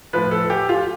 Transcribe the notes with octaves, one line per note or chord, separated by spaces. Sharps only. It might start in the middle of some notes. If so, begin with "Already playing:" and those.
A2 F3 B4
A4
G4
F4